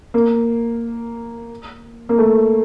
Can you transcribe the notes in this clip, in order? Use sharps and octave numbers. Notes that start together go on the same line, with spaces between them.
A#3
A#3
A3